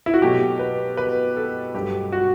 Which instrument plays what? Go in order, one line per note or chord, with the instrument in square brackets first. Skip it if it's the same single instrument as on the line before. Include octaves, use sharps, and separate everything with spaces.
[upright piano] E4
F#4
B2 F#3 A3 G4
B4
B4
A4
G2 F#3 A3 G4
F#4